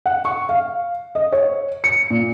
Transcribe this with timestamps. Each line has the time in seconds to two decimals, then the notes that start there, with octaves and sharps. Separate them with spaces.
0.06 F#5
0.25 C#6
0.49 F5
1.15 D#5
1.32 C#5
1.84 C#7
2.10 A#2